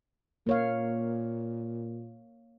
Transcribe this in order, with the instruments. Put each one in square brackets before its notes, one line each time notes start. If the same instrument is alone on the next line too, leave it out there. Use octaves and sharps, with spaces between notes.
[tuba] A#2 [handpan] A#3 C#5 F5